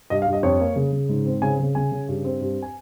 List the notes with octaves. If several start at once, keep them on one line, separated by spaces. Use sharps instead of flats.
G2 D#5
F5
G2
D#5
F2 C#5
A#3
C#3
C#3
G#2
C4
C#3 G#5
C#3
C#3 G#5
C#3
G2
C4
G2
G#5